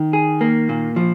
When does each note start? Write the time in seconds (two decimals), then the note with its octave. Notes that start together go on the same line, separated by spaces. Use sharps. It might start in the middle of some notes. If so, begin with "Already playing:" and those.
Already playing: D#3
0.13 G#4
0.41 A#3
0.69 A#2
0.96 F3